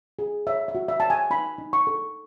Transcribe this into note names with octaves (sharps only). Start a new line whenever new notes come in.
G#4
C#5 E5
E5
F#4
E5
C#5 A5
G#5
D#4 B5
D#4
C#6
A4